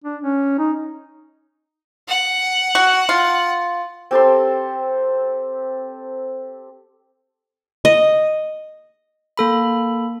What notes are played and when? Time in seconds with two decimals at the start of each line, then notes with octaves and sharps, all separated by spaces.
0.04 D4
0.22 C#4
0.59 D#4
2.08 F#5
2.75 F#4
3.09 F4
4.11 C4 G4 A4 C6
7.85 D#5
9.37 A#3 A4 B5